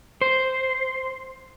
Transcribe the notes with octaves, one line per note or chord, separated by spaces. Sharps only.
C5